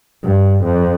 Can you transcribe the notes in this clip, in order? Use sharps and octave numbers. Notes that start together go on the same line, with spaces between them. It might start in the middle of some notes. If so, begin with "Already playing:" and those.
G2
F2